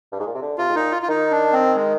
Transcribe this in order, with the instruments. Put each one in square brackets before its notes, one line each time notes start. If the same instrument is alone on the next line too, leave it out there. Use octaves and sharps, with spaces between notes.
[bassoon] G2
G#2
A#2
C3
D3
[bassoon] C3 [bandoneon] F4
[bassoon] G#2
[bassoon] A#2 [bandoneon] D#4
[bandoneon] F4
F4
[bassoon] D#3 [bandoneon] D#4
[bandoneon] D4
C4
G#3